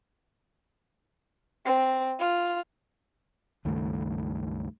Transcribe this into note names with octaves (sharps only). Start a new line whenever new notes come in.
C4
F4
C#2 G2 D#3 A3